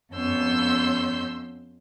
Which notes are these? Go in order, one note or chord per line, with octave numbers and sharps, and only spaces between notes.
F2 B3 C#4 C6 E6 G6